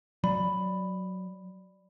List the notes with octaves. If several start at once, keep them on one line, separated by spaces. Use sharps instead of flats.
F#3 D5 B5